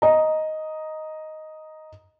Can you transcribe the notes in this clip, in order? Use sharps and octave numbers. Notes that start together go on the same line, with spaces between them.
D#5 A#5